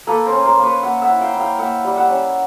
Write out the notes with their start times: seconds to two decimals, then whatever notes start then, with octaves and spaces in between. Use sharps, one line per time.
0.07 A#3 A4 B4
0.26 A#4 C5
0.32 C#4
0.45 A#4 C5
0.57 A#3
0.64 B4 C#5
0.83 A#3 E5 F#5
1.02 E5 F#5
1.09 E4
1.21 F5 G5
1.33 E4
1.39 F5 G5
1.59 A#3 E5 F#5
1.84 G3
1.97 E5 F#5
2.09 C#4